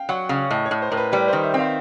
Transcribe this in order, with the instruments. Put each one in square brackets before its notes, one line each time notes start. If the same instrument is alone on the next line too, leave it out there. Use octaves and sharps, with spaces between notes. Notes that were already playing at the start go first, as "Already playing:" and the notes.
Already playing: [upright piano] F5 G5
[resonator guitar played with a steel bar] F#3 [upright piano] F#5
[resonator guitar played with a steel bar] C#3 [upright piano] F5
[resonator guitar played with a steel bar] A2 [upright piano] D#5
[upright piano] C#5
[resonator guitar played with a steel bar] A2
[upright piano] C5
[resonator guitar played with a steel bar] A2 [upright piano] A#4
[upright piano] B4
[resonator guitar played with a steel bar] G3 [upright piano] B4
[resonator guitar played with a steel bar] D#3 [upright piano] C5
[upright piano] E5
[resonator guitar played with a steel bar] C4
[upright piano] F5